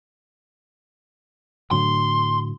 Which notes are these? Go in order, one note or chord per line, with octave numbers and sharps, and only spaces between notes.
A2 D3 F#3 C6